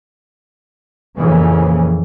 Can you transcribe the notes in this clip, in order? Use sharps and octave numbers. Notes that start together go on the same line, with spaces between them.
F2 A#2 C#3 E3